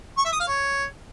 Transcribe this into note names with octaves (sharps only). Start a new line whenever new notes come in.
C#6
E5
D#6
F5
C#5